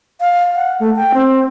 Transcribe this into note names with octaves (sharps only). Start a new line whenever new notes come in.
F5
F#5
A3
G5
C4